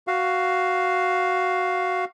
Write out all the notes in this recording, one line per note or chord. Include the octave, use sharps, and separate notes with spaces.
F#4 F5